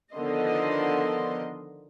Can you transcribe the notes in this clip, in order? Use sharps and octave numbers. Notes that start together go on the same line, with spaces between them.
D3 D#3 F3 B3 D#5 C6